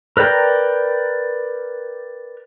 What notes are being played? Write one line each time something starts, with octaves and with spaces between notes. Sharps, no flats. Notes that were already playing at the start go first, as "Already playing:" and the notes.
A#4 B4 D5 G5 A#5